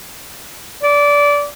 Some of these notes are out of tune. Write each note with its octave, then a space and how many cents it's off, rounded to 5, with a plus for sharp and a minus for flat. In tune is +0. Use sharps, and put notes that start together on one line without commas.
D5 -20